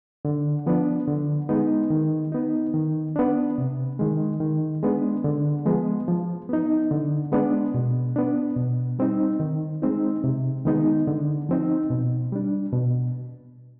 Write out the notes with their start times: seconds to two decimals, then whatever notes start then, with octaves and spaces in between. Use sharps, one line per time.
0.25 D3
0.66 F3 B3 D4
1.08 D3
1.49 G#3 B3 D#4
1.90 D#3
2.32 B3 D#4
2.74 D#3
3.16 B3 D4
3.58 C3
3.99 D#3 G#3
4.41 D#3
4.83 G#3 B3 D4
5.24 D3
5.65 F3 G#3 B3
6.08 F3
6.49 B3 D#4
6.91 D3
7.32 G#3 B3 D4
7.74 B2
8.16 B3 D4
8.56 B2
8.99 G3 C4 D#4
9.40 D#3
9.82 G#3 C4 D#4
10.24 C3
10.65 D#3 G#3 B3 D#4
11.07 D3
11.49 F3 C4 D#4
11.90 B2
12.32 G3 D4
12.73 B2